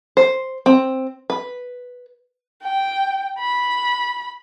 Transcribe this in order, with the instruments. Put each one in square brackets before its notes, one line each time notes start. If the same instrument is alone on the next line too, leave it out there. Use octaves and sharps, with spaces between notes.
[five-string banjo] C5
C4
B4
[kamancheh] G5
B5